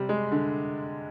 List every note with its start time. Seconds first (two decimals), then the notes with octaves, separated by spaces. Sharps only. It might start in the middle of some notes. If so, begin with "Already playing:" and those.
Already playing: C3 G3
0.09 G#3
0.32 D3